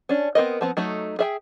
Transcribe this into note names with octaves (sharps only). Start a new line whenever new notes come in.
C#4 D4
B3 C4 A#4 D#5
F3 B3 C4
F#3 A3 D#4
G#4 E5 G5